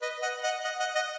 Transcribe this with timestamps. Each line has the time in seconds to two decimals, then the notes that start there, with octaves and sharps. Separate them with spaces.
0.02 B4 D#5
0.22 D#5 F#5
0.43 D#5 F#5
0.64 D#5 F#5
0.80 D#5 F#5
0.95 D#5 F#5